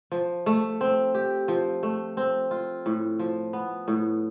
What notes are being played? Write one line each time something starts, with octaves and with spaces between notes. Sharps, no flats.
F3
A3
C4
G4
F3
A3
C4
F4
A2
F3
B3
A2